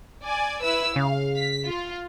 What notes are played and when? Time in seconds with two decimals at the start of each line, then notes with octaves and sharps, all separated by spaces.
0.24 D5 G#5
0.63 E4 B4 E6
0.96 C#3 F5
1.36 B6
1.65 F4